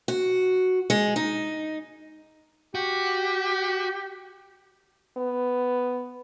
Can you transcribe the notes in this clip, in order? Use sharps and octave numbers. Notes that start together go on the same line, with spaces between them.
F#4
G#3
D#4
F#4 G4
B3